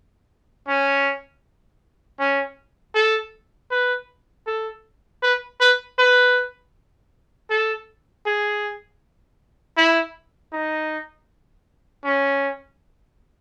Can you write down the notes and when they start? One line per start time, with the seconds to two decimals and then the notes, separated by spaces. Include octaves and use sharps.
0.68 C#4
2.19 C#4
2.95 A4
3.71 B4
4.46 A4
5.22 B4
5.60 B4
5.98 B4
7.50 A4
8.26 G#4
9.77 E4
10.53 D#4
12.04 C#4